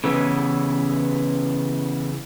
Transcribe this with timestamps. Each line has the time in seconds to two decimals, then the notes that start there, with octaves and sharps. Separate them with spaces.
0.04 C#3 E3 B3 C#4